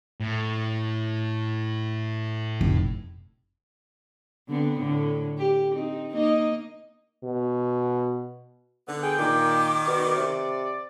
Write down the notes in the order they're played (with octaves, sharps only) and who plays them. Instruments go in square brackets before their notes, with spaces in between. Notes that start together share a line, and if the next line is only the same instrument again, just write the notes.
[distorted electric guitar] A2
[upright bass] F1
[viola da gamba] D3 B3 C4
A2 D3
G4
C4 D#4
A#3 D#4 D#5
[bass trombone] B2
[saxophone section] D3 B3
[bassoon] G#4 [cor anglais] G5
[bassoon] A#2 [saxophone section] D#3 [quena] D6
[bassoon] B2 [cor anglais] D5
[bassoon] C3